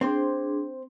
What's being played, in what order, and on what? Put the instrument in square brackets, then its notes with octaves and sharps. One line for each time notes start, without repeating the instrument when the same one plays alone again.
[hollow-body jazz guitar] C4 C5 [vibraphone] D4 G#4